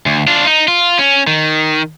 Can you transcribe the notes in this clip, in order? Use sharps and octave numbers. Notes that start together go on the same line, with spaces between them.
D2
D4 F4
D#4
F4
C#4
D#3